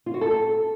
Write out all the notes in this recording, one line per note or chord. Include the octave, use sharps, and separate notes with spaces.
F4
F#4
A4